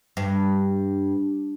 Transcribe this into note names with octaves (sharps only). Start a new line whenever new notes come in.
G2